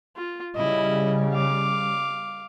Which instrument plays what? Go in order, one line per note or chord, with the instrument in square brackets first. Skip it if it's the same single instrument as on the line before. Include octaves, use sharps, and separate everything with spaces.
[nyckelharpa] F4
[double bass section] C#3 G3 [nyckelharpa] E4 D#5
[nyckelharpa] F5 D6